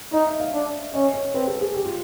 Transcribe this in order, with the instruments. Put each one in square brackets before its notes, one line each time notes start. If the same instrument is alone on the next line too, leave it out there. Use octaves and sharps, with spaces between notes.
[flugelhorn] D#4 [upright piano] D#5
[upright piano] E5
F5
[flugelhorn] D4
[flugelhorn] C#4 [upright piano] D#5
[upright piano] C#5
[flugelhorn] C4 [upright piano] B4
[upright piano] A4
G#4
G4
F4